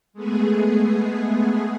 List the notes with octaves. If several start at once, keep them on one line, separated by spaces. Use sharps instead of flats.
G#3 A3 B3 G#4